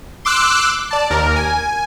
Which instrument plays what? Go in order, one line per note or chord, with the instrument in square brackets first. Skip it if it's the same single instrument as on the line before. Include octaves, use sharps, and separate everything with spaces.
[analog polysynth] C6 D6 E6 F#6
D5 A5
D#2 A#4
G#5